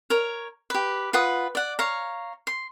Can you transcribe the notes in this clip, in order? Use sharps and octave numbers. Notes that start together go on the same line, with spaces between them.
A#4 C#5
G4 B4
F4 B4 F#5 D#6
D5 F#5
C#5 F5 A#5
C6